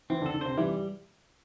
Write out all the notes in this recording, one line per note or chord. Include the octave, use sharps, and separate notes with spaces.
E3 C4 E4
D3 D4
A4
D3 D4
C3 C4 C5
E3 G3 E4